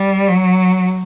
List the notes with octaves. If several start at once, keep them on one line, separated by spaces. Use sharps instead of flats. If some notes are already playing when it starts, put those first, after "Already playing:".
Already playing: G3
F#3